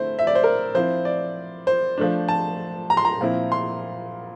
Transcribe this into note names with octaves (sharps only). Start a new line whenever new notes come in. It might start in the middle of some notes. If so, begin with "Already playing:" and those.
Already playing: D3 A3 C4 E4 C5
E5
D5
C5
A#4
F3 C4 E4 C5
D5
C5
F3 A3 D4
A5
A#5
C6
A#5
A#2 F3 C4 E4
C6